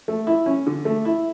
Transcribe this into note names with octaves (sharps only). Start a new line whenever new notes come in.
A3
E4
C#4
D3
A3
E4